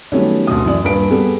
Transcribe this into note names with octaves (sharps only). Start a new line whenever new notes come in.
D#3 F#3 G3 A3 B3 C#4
D2 B2 D#6
F#2 E3 D5
D#1 G2 B4 D7
G3 B3 G#4 A4